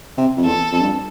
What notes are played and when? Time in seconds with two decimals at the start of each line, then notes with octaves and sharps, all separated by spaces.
0.17 C3
0.37 F2
0.45 E2 A4
0.72 F2
0.81 G2